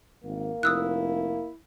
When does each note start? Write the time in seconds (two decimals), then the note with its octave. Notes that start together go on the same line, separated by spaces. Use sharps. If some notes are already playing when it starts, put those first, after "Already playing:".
0.24 G#1 A#3
0.63 F1 E4 D#6 E6 F#6